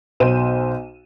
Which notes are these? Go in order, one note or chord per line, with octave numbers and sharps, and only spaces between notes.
B1 B2 C5 D#7 E7